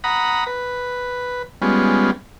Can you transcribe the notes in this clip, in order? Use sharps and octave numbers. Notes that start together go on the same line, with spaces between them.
F#5 A#5 B5 D#6
B4
G3 G#3 B3 C#4 F4